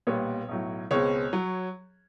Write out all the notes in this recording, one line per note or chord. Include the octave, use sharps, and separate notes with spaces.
B1 A#2 G3 B3 C#5
B1 A2 F#3
C#2 B2 G#3 C4 C#5
F#3